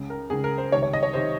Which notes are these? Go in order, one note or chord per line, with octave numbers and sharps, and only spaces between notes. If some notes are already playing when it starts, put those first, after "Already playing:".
Already playing: C#2 C#3
A#4
C#2 C#3 G#4
A#4
C5
C#2 C3 D#3 C#5
C#5
D#5
C#5
C3 D#3 C5